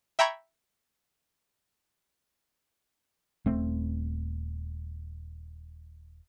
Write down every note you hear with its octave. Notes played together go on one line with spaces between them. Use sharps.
E5 G5 A#5 B5 C#6 G#6
D#1 A3 C4